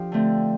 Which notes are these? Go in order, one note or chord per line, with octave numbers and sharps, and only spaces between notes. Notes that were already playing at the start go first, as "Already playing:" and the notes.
Already playing: F3 D4 G4 A4
D3 A3 C4